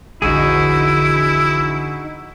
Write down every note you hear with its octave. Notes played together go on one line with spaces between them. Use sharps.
A#1 E2 D3 D#4 E4 F#4 G#4